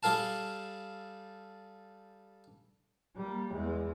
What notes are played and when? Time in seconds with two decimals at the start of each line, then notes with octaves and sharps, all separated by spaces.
0.03 G3 G#4 A4 F5 A5
3.16 G3 A#3
3.51 E2 G#3